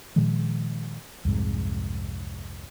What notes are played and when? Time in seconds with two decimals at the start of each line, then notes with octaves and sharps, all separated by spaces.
0.16 A#2 D#3 F3 G#3
1.25 C2 F2 G#2